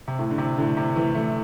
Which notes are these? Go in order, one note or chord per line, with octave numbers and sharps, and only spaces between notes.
C3
A2
D3
C3
A2 D3
C3
E3 A3
E3 A3